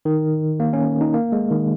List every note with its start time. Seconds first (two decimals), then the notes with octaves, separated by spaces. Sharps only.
0.05 D#3
0.60 A#3
0.73 C#4
1.01 D#4
1.14 A#3
1.32 G#3
1.51 D#3